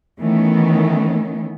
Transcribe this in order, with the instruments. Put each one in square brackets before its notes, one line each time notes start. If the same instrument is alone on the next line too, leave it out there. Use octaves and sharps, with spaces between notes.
[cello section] D#3 E3 A3 B3 C#4